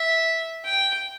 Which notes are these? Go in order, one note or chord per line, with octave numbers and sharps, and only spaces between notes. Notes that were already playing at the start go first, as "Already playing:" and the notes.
Already playing: E5
G5